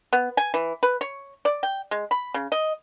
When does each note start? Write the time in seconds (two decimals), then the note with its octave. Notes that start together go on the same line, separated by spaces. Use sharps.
0.13 B3
0.37 G#5
0.54 E3
0.83 B4
1.01 C#5
1.45 D5
1.63 G5
1.91 G#3
2.11 B5
2.34 C#3
2.52 D#5